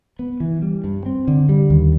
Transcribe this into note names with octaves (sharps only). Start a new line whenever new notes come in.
B3
E3
G3
G2
C4
D3
G3
D#2